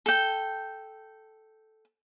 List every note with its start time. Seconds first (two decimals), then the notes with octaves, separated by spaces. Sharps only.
0.06 A4 G5